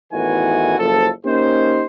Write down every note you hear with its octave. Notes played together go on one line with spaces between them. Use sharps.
A1 E2 D#3 E3 F#4 G#5
F#1 F3 A4
A#3 C#4 D#4 G4 C5